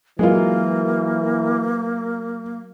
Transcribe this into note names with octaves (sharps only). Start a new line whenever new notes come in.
E3 F#3 G#3 A#3 F4 A#4 F5